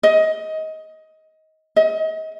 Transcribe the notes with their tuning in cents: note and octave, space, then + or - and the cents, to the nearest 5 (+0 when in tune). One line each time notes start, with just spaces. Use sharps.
D#5 +20
D#5 +35